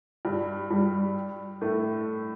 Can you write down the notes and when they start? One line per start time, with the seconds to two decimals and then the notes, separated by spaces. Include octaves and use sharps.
0.25 G2 G3
0.71 G2 G3
1.61 A2 A3